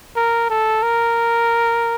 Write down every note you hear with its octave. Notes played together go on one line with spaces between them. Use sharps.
A#4
A4
A#4